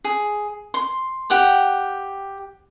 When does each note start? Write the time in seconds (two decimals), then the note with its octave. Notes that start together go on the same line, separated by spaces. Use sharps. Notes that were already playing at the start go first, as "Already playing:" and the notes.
0.04 G#4
0.74 C6
1.30 G4 F#5 G5 D6